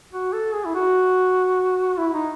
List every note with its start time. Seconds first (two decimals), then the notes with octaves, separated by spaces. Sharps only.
0.13 F#4
0.33 A4
0.54 G#4
0.65 E4
0.75 F#4
1.98 E4
2.14 D#4